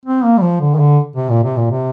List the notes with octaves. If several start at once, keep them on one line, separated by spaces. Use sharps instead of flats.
C4
A#3
G3
F3
D3
D#3
D3
C3
A#2
C3
A#2
C3